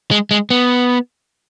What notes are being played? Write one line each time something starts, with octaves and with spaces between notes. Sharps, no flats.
G#3
G#3
B3